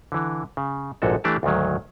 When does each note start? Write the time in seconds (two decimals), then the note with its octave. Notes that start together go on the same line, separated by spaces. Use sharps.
0.12 D3 E3
0.57 C#3
1.02 A#1 G#2 C3 F#4 A4
1.24 E3 A3 D4 G4 D5 A5
1.43 D2 G#2 D#3 F#3